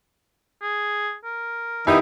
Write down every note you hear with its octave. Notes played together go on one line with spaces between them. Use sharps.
G#4
A#4
D#3 B3 D#4 E4 G4 D#5